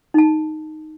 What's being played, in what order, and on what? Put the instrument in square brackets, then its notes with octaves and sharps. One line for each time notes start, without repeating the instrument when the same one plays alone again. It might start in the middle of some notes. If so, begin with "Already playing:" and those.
[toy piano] D#4 A5